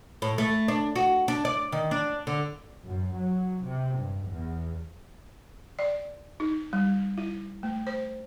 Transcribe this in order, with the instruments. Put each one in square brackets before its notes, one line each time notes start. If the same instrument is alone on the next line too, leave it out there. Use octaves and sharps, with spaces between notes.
[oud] A2
A3
D4
F#4
D4
D5
D#3
D4
D3
[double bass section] F#2
F#3
C3
G2
E2
[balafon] D5
D#4
G3
E4
A3
C5